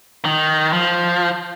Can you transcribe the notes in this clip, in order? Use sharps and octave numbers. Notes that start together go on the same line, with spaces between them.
D#3
F3